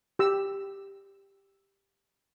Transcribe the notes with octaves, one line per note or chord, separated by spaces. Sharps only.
G4 E6